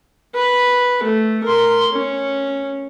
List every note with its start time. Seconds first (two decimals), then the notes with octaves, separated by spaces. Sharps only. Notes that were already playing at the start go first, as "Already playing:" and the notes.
0.35 B4
1.03 A3
1.44 A#4 C6
1.92 C#4